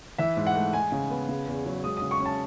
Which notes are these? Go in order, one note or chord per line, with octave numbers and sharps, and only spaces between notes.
E3 E5
G#2
F#5
A3
G#3 G#5
C#3
B3
C#3
E2
F#3
G#3 D#6
D#6
C#3
C#6
C#4
A5